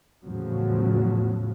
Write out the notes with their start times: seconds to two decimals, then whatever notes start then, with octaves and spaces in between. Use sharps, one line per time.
0.24 E2 A2 C#3 F3 F#3